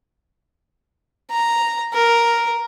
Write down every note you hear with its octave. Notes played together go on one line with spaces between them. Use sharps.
A#5
A#4